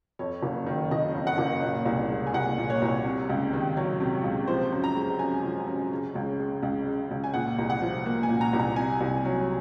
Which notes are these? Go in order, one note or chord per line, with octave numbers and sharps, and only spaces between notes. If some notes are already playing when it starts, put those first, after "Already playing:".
F2 C#5
F#1
D#3
F#1 D#5
F2
F#5
F#1
A#2
C2
G#3
G#5
C2 F#5
A#2
C#5
C2
C3
C#2
D#3
F#3 C#5
C3
C#2
F3 C5
F#2
A#5
G#3
F#2 G#5
F3
F#2
C#3
C#2
G#3
C#2
C#3
C#2
G#5
A#2 F#5
C2
F#5
F3
A#3
G#5
A#2
A#5
C2
A#5
C3 G#5
C2
F#3